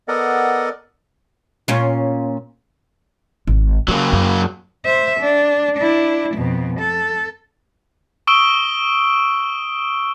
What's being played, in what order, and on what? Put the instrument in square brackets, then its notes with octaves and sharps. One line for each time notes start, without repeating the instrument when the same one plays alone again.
[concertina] B3 A4 A#4 D5 D#5 F#5
[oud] A#2 C#4 F4
[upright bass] G#1
[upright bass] C#3 [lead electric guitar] F#3 A#3
[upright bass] F#2
[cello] C5 E5
D4
D4 E4
F2 B2
A4
[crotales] C#6 D#6 E6 D7 G7